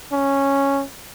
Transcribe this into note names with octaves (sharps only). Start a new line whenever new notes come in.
C#4